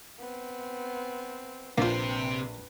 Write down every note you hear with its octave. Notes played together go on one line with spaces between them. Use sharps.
B3 C4
A#1 C3 A#3 F4 B4 C5